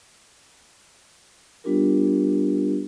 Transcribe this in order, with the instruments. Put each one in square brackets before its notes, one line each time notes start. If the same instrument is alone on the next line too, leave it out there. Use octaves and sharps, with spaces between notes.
[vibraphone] G3 B3 D4 F4 G4 A#4